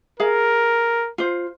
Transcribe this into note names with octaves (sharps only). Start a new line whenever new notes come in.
G#4 A#4 F5
F4 C5